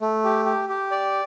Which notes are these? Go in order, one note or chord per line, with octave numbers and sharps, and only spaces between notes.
A3
G4
G4
G4
D5